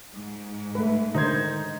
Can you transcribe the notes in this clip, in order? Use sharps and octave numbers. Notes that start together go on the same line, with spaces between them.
G#2
A3 B4
D3 D#3 D#4 C5 G#6